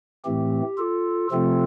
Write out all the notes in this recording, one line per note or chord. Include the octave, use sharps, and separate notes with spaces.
A2 E3 A3 C4 G4
F4 A4
C3 F3 A3 C4 F4 A4